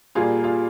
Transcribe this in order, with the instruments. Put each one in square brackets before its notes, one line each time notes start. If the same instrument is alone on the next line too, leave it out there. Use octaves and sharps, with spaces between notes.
[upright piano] A#2 G3 A#3 F4 G#4
F4 G#4